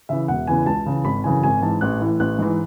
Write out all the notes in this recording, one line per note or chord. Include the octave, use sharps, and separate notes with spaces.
C#3 E3 E5
E1 F#5
E2 C#3 E3 G#5
C#2 A5
C#3 E3
G#1 B5
F#2 C#3 E3 G#5
G#1 G#5
G#2 E3 A5
A1 F#6
A2 E3
A1 F#6
G#2 E3